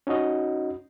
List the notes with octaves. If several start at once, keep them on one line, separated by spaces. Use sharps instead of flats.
C#4 D#4 F#4 D#5